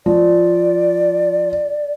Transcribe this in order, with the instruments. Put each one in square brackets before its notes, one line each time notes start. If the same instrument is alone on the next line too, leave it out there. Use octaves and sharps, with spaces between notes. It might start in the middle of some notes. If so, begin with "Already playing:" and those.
[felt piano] F3 [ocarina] D5